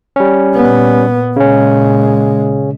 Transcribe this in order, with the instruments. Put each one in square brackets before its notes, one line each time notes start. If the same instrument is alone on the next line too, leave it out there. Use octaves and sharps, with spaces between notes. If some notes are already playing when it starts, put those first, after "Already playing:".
[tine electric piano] G3 C#4
[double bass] A#2 B3
[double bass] A#2 G#3 [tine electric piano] C#3 C#4